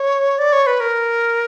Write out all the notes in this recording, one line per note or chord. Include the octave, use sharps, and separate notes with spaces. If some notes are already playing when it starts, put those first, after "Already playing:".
Already playing: C#5
D5
C#5
B4
A#4